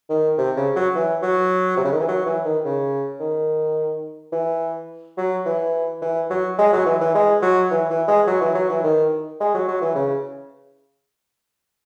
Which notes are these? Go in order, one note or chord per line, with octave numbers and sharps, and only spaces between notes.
D#3
C3
C#3
F#3
E3
F#3
C3
C#3
D#3
E3
F#3
E3
D#3
C#3
D#3
E3
F#3
E3
E3
F#3
G#3
F#3
E3
E3
G#3
F#3
E3
E3
G#3
F#3
E3
F#3
E3
D#3
G#3
F#3
F#3
E3
C#3